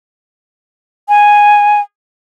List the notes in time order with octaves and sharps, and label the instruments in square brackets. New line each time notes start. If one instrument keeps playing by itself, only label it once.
[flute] G#5